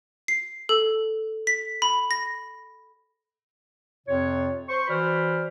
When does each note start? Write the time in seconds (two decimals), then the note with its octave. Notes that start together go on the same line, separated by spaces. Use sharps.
0.28 C7
0.69 A4
1.47 B6
1.82 B5
2.11 A#6
4.06 F2 C3 F4 C#5
4.68 C5 C#6
4.87 E3 F#4 C5 D5 B5 F6